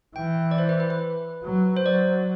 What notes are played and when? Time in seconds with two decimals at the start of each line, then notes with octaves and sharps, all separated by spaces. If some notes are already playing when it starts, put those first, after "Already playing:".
0.16 E3 G5
0.51 D5
0.58 C5
0.69 B4
0.80 B4
0.90 B4
1.43 F#3
1.77 C5
1.86 F#3 D5